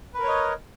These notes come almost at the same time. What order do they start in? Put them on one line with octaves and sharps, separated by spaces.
B4 A#4 C#5 D#5